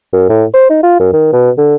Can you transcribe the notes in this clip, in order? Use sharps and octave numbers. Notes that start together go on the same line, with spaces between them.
F#2
A2
C5
D#4
F4
F#2
D#3
B2
D3